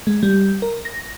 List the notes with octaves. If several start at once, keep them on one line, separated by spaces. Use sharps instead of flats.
G#3
G3
A#4
A#6